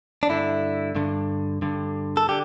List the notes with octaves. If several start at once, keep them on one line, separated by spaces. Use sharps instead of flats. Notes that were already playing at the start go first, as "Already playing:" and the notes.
D4
G2 D3 E4
G2 D3
G2 D3
A4
D3 G4